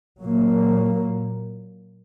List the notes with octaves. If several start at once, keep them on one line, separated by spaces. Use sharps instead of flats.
A#2 F#3 A#3